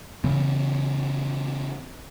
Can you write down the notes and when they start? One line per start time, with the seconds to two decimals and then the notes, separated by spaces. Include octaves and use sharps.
0.24 C#3 E3 C4